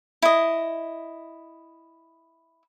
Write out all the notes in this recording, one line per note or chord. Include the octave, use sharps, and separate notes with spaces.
E4 D#5